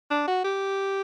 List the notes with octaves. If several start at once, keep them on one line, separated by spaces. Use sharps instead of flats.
D4
F#4
G4